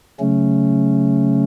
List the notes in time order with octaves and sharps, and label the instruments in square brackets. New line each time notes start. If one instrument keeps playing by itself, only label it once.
[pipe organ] C#3 F#3 A3 C#4